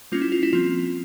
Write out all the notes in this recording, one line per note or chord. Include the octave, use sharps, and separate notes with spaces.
G3 A#3 C#4 F4
E4
F4
E4
F3 C4 F4